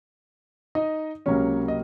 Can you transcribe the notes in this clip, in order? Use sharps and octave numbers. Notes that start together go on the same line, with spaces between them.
D#4 D#5
C#2 C3 F#3 A#3 C#4 C#5
D#5